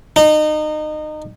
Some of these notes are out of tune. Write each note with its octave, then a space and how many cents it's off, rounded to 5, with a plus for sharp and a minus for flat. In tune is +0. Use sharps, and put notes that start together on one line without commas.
D#4 -25